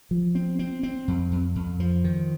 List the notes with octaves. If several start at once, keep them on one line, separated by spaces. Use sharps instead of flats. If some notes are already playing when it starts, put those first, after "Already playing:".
F3
C4
C4
C4
F2
F2
F2
F3
D#3